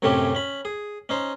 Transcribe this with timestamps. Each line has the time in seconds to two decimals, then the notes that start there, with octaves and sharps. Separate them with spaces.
0.02 F#2 A2 C3 A3 C#4 G4
0.35 C#4 B5
0.65 G#4
1.09 C#4 D#4 C5